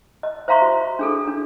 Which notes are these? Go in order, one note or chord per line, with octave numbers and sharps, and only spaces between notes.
D#5
C5 E5 F5 A#5 C6 C#6
F#4
D4 G#4 A4
D4